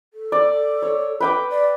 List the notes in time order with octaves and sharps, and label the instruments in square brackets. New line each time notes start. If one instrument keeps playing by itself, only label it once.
[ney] A4
[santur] D5
C#5
B4 G5 D6
[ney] D5